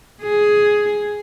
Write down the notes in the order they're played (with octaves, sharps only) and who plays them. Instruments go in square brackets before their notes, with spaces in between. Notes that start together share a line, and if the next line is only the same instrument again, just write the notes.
[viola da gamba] G#4